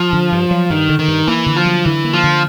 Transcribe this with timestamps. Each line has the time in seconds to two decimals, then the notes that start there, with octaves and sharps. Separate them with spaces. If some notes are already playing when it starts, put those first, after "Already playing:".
Already playing: F3
0.13 D3
0.32 G2
0.51 F#3
0.70 G2 D#3
0.89 D3
0.99 D#3
1.08 G2
1.27 E3 A#3
1.46 D3
1.56 F3
1.66 F#3
1.85 D3 E3
2.04 A#3
2.13 F3
2.23 D3